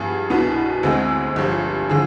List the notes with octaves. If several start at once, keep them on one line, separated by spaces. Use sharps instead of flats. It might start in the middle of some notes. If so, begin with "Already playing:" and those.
Already playing: G2 F3 B3 G#4
C2 B2 B3 D4
D2 D3 G#3 C4 G#4
G1 G2 F3
D3 F3 G#4